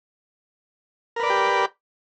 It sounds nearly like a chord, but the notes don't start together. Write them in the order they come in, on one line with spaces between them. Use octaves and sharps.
A#4 B4 D5 B5 G4